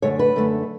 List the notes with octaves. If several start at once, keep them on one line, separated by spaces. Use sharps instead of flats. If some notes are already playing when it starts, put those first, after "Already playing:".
F#2 D3 A3 C#5
B4
F#2 D3 A3